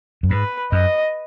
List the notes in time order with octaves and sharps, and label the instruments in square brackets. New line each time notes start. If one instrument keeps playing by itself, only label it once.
[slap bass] F#2
[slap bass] G#2 [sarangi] B4
[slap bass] F#2 [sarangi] D#5